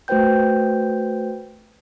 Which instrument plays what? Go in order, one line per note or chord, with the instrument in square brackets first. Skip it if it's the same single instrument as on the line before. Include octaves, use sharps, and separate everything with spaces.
[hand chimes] A3 F#4 B4 C5 G5 G6